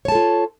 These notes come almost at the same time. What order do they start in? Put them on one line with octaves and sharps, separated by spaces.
C#5 A5 A4 F4